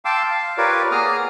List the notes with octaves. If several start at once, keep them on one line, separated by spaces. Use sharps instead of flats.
F5 G5 A5 C6 D6 E6
F5
F4 G4 A#4 B4 C#5 D5
A#3 B3 G#4 A#5 D#6 F6